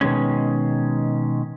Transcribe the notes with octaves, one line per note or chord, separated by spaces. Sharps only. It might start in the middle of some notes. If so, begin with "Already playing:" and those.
B2 D#3 G#3 C#4